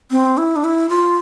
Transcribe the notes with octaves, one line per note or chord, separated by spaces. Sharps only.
C4
E4
D4
E4
F4